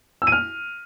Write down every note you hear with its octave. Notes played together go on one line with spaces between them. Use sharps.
E6
D#7
F6